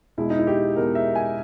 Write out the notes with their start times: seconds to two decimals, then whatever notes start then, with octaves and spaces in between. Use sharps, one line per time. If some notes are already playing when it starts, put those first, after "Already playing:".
0.17 E2 B2 G#3 E4
0.30 D#4
0.39 E4
0.47 G4
0.75 E2 B2 G#3 A#4
0.95 E5
1.15 G#5